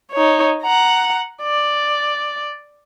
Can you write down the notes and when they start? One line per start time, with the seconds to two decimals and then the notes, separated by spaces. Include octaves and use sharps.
0.12 D#4 C#5
0.63 F#5 A#5
1.42 D5